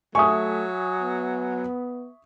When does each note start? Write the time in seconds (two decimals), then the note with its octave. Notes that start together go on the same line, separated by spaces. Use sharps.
0.15 F#3 A3 E5 G#5 C#6 D#6
1.00 B3